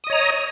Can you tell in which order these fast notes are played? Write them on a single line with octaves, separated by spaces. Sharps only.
D#6 D#5 C#5 A#5